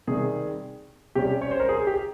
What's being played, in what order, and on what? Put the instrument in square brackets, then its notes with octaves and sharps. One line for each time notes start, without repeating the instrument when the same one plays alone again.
[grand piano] C3 D#3 G3 G#4
C3 G3 C#4 G4
C#5
C5
A#4
G#4
G4